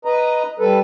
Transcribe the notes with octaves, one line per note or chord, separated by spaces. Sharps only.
B4 D#5 A#5
G3 A4 B4